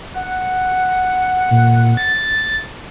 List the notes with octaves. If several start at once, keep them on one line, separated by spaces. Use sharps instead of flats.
F#5
A#2
A6